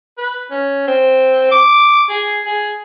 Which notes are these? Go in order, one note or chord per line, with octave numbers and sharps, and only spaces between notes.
B4
C#4
C4
D6
G#4
G#4